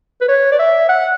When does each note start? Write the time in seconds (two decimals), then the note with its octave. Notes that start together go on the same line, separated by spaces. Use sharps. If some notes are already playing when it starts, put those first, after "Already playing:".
0.21 B4
0.28 C#5
0.52 D5
0.59 E5
0.89 F#5